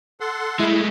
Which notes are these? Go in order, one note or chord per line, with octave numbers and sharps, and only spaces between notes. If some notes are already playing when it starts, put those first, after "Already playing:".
A4 F#5 C6
G#3 A3 E4